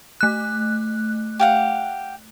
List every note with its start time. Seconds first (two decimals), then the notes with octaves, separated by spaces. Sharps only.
0.21 A3 F#6
1.39 G4 F5 F#5